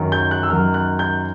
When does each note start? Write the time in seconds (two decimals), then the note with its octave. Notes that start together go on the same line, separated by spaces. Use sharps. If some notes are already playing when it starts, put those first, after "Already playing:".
Already playing: F#2 D#3 F#3
0.12 G6
0.31 F#6
0.43 E6
0.50 F#2 D#3 F#3 F6
0.74 F#6
0.99 G6